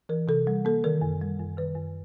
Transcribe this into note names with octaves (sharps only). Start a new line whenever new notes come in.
E3 A#4
C3 A4
G3
A#3 A4
D#3 A#4
F#2
G3
F#2
D#3 B4
F#2